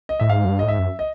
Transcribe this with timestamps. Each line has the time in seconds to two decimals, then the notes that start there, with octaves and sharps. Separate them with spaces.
0.09 D#5
0.20 A2 E5
0.29 G#2 F5
0.45 F#2
0.49 G2
0.59 A2 D#5
0.68 G#2 E5
0.79 F#2
0.99 D#5